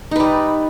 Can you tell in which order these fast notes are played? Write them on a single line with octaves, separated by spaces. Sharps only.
D#4 B4 G3